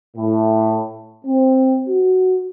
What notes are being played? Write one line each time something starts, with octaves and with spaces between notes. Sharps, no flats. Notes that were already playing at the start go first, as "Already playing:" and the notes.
A2
C4
F#4